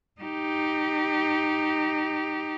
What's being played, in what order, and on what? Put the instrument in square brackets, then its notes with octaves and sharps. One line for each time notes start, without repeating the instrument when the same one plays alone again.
[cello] D#4 G4